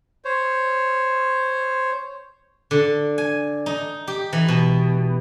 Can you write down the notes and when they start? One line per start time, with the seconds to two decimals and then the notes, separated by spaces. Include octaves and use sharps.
0.25 C5 C#5
2.71 D3
3.18 G#5
3.66 D#4
4.07 G4
4.33 E3
4.48 B2